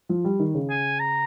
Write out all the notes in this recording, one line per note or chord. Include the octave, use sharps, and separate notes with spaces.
F3
G3
D#3
C#3
G#5
A#5